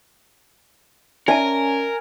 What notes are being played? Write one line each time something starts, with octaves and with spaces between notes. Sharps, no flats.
C#4 A#4 D5 E5 G#5 A5